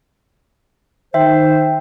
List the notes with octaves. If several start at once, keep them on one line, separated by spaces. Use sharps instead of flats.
D#3 C5 E5 G5